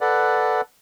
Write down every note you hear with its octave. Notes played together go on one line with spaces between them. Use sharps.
A4 B4 D5 F#5